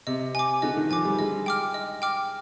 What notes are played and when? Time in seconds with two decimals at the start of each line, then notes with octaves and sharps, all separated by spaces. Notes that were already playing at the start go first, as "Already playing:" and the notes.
0.07 C3 D#5
0.35 G#5 D6
0.62 D3 D#5
0.76 D#3
0.90 F3 G#5 D6
1.05 G3
1.19 G#3 D#5
1.46 G5 D6 F6
1.74 D#5
2.02 G5 D6 F6